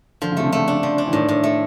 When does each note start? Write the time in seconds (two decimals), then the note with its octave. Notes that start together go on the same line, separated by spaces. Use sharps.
0.22 D3 F3
0.32 C#3
0.37 C3 A3
0.44 C#3
0.52 D3 A3
0.68 D4
0.83 F3
0.98 D4
1.07 E3
1.13 A2 D#3
1.29 A2
1.43 A3